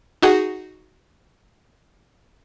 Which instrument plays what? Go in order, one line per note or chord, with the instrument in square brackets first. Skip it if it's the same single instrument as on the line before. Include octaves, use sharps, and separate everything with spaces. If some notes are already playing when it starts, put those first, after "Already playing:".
[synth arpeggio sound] D#4 F#4 G#4 F#5